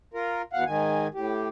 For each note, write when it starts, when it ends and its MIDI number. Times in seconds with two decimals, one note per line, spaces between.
0.14 0.42 65
0.14 0.42 70
0.53 0.64 40
0.53 0.64 47
0.53 0.64 77
0.53 0.64 78
0.66 1.07 44
0.66 1.07 51
0.66 1.07 80
1.14 1.48 45
1.14 1.48 67